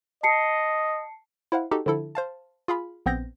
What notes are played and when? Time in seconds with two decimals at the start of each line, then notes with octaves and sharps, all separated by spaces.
0.23 D#5 A5 C7 C#7
1.52 E4 C5 F5 F#5
1.71 D#4 F#4 G4 A4
1.86 D3 F3 E4 A4
2.15 C5 F5 A5
2.68 F4 G#4 F5 B5
3.06 A#1 B3 C4 G6 A#6